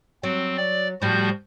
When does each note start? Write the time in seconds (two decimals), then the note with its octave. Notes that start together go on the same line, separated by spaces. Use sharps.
0.23 F#3 C4
0.57 D5
1.02 A2 F3 G3 F#4 G6